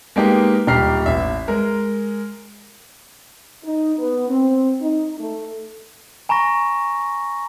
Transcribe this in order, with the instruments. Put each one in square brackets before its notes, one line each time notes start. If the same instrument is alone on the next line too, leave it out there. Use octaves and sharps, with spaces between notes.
[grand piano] G#3 A#3 B3 D#4 G4 A#4
D#1 G4 A#5 F6 C7
A1 E5
G#3 A#4
[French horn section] D#4
B3
C4
D#4
A3
[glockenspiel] G#5 A#5 B5 C#6 A#6